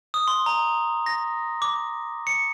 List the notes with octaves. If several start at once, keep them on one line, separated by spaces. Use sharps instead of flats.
D#6
C6
A#5
A#6
D6
C#7